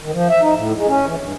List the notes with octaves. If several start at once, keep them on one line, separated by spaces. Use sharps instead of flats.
D#3
F3
E5
D#4
A2
G#3
C#4
E3
G2